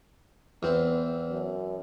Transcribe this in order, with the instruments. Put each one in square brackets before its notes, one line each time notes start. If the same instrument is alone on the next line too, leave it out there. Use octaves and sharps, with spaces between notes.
[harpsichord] E2 C4 [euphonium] B3
[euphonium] F#2